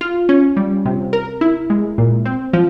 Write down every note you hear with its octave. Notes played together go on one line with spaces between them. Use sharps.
F4
C#4
G3
C3
A#4
E4
G#3
A#2
C4
F3